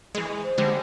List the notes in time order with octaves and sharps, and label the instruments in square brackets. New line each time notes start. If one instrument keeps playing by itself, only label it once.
[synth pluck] E3 G#3
[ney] C5
[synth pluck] D3 G3 G#3